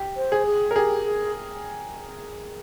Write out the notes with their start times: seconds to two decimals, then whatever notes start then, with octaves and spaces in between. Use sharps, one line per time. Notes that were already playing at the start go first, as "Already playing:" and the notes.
Already playing: G4
0.16 C5
0.32 G#4
0.46 G#4
0.71 A#4
0.75 G4 G#4
1.05 G#4